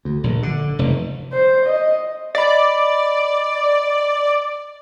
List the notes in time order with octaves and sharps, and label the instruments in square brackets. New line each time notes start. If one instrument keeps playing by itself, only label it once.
[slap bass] D2
A#1
D3
F1
[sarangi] C5
D#5
[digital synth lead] D5 [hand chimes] D#5 B5